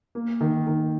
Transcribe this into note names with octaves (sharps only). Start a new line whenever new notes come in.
A#3
D#3
D#3